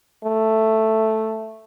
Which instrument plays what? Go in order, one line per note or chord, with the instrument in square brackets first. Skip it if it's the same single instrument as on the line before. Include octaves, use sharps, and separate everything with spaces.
[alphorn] A3